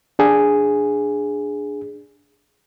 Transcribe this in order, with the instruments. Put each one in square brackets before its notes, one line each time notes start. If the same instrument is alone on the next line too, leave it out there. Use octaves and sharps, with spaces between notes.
[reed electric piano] D4 G#4